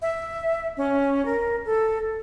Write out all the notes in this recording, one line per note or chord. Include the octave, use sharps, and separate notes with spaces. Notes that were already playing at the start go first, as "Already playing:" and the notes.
E5
C#4
A#4
A4